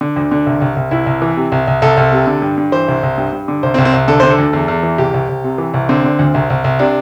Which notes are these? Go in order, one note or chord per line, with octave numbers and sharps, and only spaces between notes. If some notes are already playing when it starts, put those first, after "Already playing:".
D3
D2
D3
C2
C2
C2
C2 E4
C2
E3
C3
C2
C2
C2 A4
C2
C3
D3
G2
G2
E3 C5
C2
C2
G2
G2
D3
C2 C5
C4
C2
C4
C2
D3 A4
D3 C5
A4
D2
E2
E2
E3
C2 G4
C2
C2
C3
E3
C2
D3 C4
D3
D2
C2
C2
C2
C3 D4